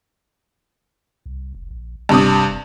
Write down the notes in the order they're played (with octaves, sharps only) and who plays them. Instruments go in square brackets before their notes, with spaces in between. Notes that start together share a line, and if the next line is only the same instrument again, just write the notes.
[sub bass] C2
F1
A#1
[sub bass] D#1 [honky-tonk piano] G2 C3 D#6
[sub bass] F1